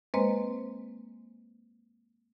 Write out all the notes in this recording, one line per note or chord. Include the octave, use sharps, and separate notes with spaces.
G#3 A#3 C4 B4 C5 D#5